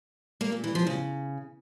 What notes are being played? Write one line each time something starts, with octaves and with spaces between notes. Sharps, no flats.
A#3
A#2
E3
F3
C#3